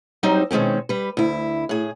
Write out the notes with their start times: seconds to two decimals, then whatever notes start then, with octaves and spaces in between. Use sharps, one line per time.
0.23 F#3 G3 C4 D#4 C5
0.51 B2 D#3 G#3 C4 C#4
0.89 G3 B4
1.17 D2 E4
1.69 A2 G#4